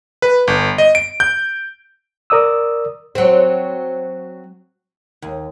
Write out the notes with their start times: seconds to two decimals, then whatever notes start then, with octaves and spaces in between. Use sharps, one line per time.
0.22 B4
0.47 G1
0.78 D#5
0.95 D7
1.20 G6
2.30 A#4 D5 D#6 E6
3.15 F#3 C4
5.22 D#2